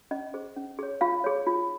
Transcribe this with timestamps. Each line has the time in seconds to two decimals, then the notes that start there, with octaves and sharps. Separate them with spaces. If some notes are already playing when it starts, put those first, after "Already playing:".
0.11 C#4 D#5
0.34 G#4 C5
0.56 C#4
0.79 G#4 C#5
1.01 F4 F5
1.24 G#4 C#5
1.46 F4